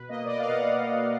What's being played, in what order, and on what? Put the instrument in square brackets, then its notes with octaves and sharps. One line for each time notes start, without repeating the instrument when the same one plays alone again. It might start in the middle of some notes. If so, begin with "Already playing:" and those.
Already playing: [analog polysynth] B2 B4
A#3 D#5
D5
D#5
F5
B2 F#5